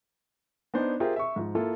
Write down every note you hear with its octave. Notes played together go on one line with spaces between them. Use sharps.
B3 D4 D#4 C5 D5
F4 G4 G#4 A#4 C5 E5
E5 C#6
G#2 F3
A#3 E4 F4 A4